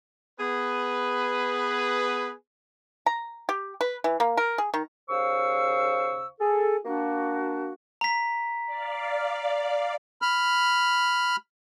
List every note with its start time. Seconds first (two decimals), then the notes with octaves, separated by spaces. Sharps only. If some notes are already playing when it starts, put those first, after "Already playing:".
0.40 B3 G#4 B4
3.06 A#5
3.49 G4
3.81 B4
4.04 E3
4.20 A#3
4.37 A#4
4.58 G#4
4.74 D#3
5.09 D#2 C#3 C5 F5 C#6 E6
6.40 G#4 A4
6.85 A#3 D4 F#4
8.01 A#5 B6
8.66 D5 F5
10.22 B5 F6